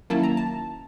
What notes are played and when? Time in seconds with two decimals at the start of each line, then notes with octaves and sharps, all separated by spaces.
0.10 D#3 F#3 A#3 C#4 E4 A5
0.23 A#5
0.37 A5